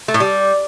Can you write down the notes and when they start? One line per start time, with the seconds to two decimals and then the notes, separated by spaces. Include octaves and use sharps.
0.08 A3
0.14 A2
0.20 G3